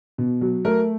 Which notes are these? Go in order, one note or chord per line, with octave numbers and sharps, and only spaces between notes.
B2
F#3
A3 A#4